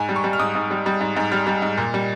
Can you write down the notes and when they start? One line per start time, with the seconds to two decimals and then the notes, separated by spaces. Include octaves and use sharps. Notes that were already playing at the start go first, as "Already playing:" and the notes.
Already playing: G#2 G#5
0.09 G3
0.16 C#6
0.24 G3
0.33 F6
0.39 G#2 D#6
0.55 G#2
0.71 G3
0.86 G3
1.01 G#2
1.16 G#2
1.32 G3 F6
1.47 G3
1.62 G#2
1.77 A#2
1.94 G3